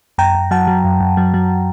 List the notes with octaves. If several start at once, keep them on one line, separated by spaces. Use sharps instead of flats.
F#2 G5 A#5
F#2
F#3 F#5 A5
F#3
F#2
F#2
F#3
F#3